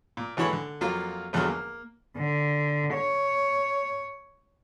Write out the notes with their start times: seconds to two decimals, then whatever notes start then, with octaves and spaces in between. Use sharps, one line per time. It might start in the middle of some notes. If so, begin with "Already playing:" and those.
0.17 A#2
0.37 G#1 D3 E3 C#5 B5 C#6
0.53 D3
0.81 F2 F#3 A#3 F4 F5
1.33 G#1 E2 D3 F3 F#3 F6
1.48 A#3
2.17 D3
2.94 C#5